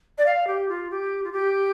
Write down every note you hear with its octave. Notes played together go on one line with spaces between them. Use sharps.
D5
F5
G4
F4
G4
F4
G4